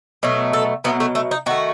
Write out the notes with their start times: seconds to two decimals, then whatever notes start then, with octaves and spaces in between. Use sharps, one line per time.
0.23 B2 F#3 A3
0.53 A4
0.84 B2 F#3 A3 B3
1.00 A3
1.15 A3
1.31 D#4
1.46 D#3 A3 F#4